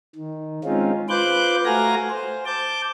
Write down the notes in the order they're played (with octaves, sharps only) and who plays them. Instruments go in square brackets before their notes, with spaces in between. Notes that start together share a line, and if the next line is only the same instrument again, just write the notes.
[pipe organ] D#3
G#3 C4 C#4 D#4 F4
F4 B4 C5 D6 F#6 G6
A3 F#4 F5 G#5 A#5 A#6
C5
A5 D6 G6